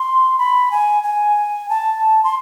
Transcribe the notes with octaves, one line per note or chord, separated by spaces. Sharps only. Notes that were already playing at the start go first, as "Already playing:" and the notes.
Already playing: C6
B5
G#5
G#5
A5
C6